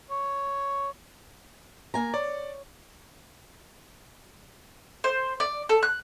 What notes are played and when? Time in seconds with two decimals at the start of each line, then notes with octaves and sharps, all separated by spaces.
0.10 C#5
1.94 A#3 G#5 A#5
2.14 C#5 D5
5.04 C5
5.40 D5
5.69 A4
5.83 F#6